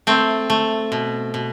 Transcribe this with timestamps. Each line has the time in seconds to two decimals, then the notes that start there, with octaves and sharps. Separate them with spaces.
0.07 A3 C4
0.50 A3
0.92 B2
1.34 B2